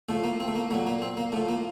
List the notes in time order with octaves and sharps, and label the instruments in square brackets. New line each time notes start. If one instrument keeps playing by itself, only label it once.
[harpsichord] A2 F3 A3
A#3
C4
A3
A#3
F#3 A3
A#2
A#3
C4
A#3
A2 A3
F3
A#3